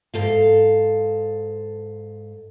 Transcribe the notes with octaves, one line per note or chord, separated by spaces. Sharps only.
G#2 A4 F5